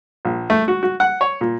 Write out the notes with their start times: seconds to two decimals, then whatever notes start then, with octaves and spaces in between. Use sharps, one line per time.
0.25 A#1
0.50 A3
0.68 F#4
0.83 F#4
1.00 F#5
1.21 C#5
1.41 A#2